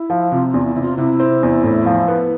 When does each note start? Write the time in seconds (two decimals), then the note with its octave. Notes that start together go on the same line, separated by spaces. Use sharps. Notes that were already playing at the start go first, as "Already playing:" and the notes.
Already playing: E4
0.10 F3
0.32 C3 F4
0.49 E2 F4
0.65 E4
0.76 C3 E4
0.82 F4
0.98 C3 E4
1.20 C4
1.43 E2
1.64 A2
1.86 F3
2.08 B3